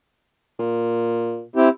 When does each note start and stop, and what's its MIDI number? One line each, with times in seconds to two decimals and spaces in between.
0.59 1.43 46
1.56 1.69 60
1.56 1.69 64
1.56 1.69 67